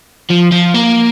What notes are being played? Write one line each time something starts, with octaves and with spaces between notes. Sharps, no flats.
F3
F3
A#3